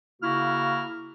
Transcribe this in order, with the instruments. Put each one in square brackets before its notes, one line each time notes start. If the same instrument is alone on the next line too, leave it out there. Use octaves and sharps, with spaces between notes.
[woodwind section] C#3 A#3 E4 F#4 F6